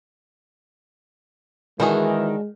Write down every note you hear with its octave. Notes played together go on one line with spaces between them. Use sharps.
D#3 E3 G#3 D4 F#4 G#4